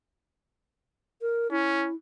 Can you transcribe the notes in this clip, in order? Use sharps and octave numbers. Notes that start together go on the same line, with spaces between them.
A#4
C#4 E4